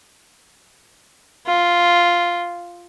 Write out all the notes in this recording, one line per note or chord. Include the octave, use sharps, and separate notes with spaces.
F4